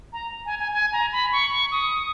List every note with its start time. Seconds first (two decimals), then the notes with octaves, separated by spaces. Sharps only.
0.13 A#5
0.46 G#5
0.59 G#5
0.72 G#5
0.93 A#5
1.12 B5
1.32 C#6
1.52 C#6
1.72 D#6